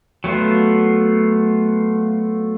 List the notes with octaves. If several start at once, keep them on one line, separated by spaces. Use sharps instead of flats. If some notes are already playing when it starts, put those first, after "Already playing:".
F#3 A3 B3 F4